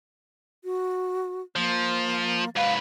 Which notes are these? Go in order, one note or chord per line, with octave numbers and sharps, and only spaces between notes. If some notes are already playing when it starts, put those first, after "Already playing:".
F#4
F3 A#3
G#2 B4 F5